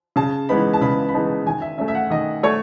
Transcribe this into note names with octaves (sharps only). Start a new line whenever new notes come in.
C#3 A5
E3 G#3 B3 D#4 B5
A5
C#3 B5
B5
E3 G#3 B3 D#4 A5
D#3 G#5
E5
A3 C#4 E5
E5
F#5
D#3 D#5
A3 C#5